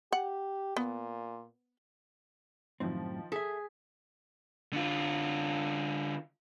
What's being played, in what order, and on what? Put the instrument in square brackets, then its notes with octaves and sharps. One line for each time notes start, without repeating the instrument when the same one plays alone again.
[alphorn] G4 [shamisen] F#5
[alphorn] A#2 [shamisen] B3
[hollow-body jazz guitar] F#2 A2 C4 [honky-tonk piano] D#3 F3
[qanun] G#4 [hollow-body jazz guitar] A4 E5 [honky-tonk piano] B6
[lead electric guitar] D3 F4